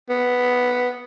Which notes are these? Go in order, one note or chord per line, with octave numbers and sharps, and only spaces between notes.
B3